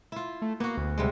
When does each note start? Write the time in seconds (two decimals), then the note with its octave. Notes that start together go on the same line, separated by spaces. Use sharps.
0.12 E4 F4
0.42 A3
0.60 A#3 B3 F#4
0.77 D2
0.98 D2 C3 G3 G#3